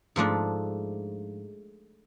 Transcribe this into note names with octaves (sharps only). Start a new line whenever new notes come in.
G#2 F3 A3 D4